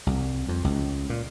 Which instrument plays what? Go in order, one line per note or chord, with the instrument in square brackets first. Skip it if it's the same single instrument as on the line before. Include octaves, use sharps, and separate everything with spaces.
[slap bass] C2
F2
C#2
A#2